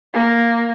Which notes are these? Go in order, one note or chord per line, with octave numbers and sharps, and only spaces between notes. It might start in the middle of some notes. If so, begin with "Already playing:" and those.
A#3